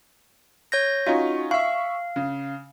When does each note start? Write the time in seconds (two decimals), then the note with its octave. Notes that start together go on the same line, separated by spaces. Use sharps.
0.72 C#5 G6 A#6
1.07 C#4 D#4 F4 F#4
1.51 E5 F5 C#6
2.16 C#3